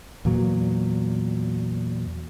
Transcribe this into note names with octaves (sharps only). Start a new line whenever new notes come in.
E2 A#2 F#3